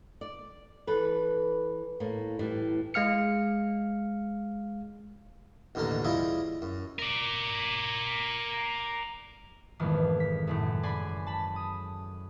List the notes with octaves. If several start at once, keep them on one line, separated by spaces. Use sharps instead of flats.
D5
E3 A4 B4
A2 A#3
A2 E3 G3
G#3 F5 F6 C#7
A1 D#2 B2 D3 A#4 A5
E2 G3 E4 F4 D#5
F#2
A#4 D5
B1 F2 G#2 D#3 E3 A3
B6
F#2 A2 C#3
D5 G#5 B5 C6
A5 B5
D#6